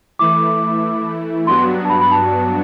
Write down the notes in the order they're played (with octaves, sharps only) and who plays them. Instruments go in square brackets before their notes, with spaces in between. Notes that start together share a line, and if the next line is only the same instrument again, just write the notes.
[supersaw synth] E3 A3 E4 [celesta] D6
[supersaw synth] G2 F#3 B3 D4 F#4 [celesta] C6
[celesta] A5
B5
B5
A5